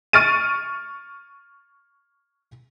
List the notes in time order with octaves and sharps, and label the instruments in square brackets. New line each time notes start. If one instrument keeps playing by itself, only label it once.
[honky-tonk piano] C#6 F6 A6 D7 D#7